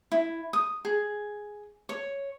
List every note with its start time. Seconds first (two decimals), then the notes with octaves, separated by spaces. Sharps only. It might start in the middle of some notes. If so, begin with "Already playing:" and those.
0.12 E4
0.53 D#6
0.85 G#4
1.89 C#5